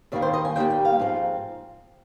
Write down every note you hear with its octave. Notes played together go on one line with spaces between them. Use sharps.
D#2 D#3 G3 A#3 D5
C5
D#5
G#5
D#2 D#3 G3 A#3 G5
G5
F5
G#2 F3 C4